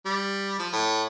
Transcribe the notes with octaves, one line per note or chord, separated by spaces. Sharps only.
G3
F3
A2